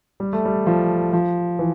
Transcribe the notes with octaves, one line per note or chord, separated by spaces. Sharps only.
G3
A3
G3
F3
F3
E3